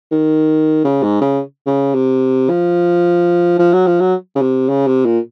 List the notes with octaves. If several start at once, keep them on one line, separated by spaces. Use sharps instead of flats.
D#3
C#3
G#2
C#3
C#3
C3
F3
F3
F#3
F3
F#3
C#3
C3
C#3
C3
A#2